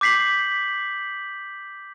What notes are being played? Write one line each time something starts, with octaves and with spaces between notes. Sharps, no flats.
D6 G6 B6 C7 F#7